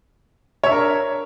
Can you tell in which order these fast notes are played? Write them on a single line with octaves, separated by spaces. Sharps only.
C#5 E5 D4 A#4